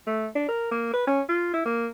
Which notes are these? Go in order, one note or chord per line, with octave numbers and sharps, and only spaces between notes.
A3
D4
A#4
A#3
B4
C#4
F4
E4
A#3